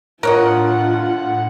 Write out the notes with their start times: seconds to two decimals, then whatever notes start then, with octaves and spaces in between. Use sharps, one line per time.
0.23 A2 D4 F4 A#4 C#5 D#5 F#5